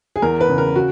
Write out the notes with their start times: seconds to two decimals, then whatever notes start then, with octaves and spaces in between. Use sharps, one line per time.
0.16 G#4
0.22 E2 A#4
0.41 B4
0.49 C#3
0.58 A#4
0.75 F#4